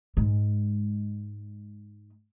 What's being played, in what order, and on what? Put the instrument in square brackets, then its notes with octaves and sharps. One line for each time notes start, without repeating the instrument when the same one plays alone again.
[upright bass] G#2 G#3